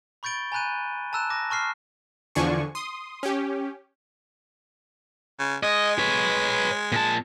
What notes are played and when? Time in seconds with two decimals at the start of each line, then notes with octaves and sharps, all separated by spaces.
0.23 B5 C#6 G6 A6 D7 G7
0.52 G#5 A#5 B5 F#6 G6 D#7
1.13 A5 A#5 E6 F#6 E7
1.30 D6 A#6
1.50 A5 C#6 F6 C7
2.35 E2 D3 F3 D4 G#5 C#6
2.75 C6 D#6
3.23 C#4 G4
5.39 C#3
5.63 G#3 D#5
5.99 B4 C#5
6.92 A#2 A5